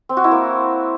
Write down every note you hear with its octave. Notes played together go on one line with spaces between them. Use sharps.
C4
F#4
E4
A#3